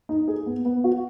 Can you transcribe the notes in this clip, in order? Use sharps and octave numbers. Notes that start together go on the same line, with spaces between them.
D#4
G#4
B3
B3
F#4